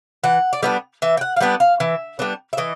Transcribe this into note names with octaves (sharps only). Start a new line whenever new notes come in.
E3 F#5
D5
G3 B3 D4 D#5
E3 E5
G5
F#5
F5
G3 B3 D4 F#5
F5
E3 E5
G3 B3 D4
E5
E3 D#5